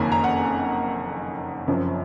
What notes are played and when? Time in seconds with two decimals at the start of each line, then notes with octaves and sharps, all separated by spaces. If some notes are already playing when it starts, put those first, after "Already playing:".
Already playing: F#1 F2 D#3 A#3 C#4 G#5 A#5
0.12 A#5
0.24 F#5
1.67 F#1 F#2 F3 C4